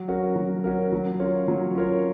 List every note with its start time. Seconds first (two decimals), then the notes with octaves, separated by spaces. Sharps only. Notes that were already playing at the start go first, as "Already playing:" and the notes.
Already playing: F#3
0.08 C#4 F#4 A#4
0.36 F#3
0.64 C#4 F#4 A#4
0.93 F#3
1.20 C#4 F4 A#4 C#5
1.48 F#3
1.75 C#4 F4 A#4 C#5